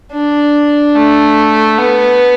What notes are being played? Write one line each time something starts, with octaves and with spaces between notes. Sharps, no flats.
D4
A3
B3